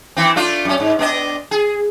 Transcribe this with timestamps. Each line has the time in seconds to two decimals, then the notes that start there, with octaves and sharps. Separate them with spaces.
0.17 E3 C4
0.36 A3 D4 F4
0.65 F#2 C#4
0.80 G#2
0.99 B3 D4 D#5
1.51 G#4